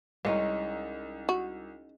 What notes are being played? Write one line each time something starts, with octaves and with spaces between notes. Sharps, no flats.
C2 G#3 C#4 D#4
F#4